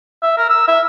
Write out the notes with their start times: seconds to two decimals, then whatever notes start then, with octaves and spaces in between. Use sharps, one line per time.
0.22 E5
0.38 A#4
0.50 E6
0.68 E5